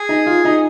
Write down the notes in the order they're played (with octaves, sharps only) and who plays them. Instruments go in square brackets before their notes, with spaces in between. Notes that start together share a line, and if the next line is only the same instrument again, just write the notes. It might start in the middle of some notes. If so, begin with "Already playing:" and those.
Already playing: [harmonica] G#4
[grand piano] D#4
F4
D#4